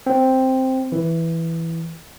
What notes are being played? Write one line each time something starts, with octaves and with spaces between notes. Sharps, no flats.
C4
E3